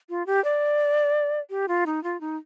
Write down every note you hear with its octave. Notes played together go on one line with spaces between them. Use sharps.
F4
G4
D5
G4
F4
D#4
F4
D#4